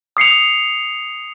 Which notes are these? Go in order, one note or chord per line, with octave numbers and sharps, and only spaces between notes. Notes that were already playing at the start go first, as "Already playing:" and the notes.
D#6 C7 C#7 F7